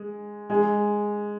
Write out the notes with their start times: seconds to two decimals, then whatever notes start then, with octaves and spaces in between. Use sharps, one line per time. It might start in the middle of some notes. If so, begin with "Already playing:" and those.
Already playing: G#3
0.50 G#3